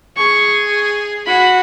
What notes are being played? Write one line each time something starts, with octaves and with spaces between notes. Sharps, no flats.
G#4 C#6
F#4 B5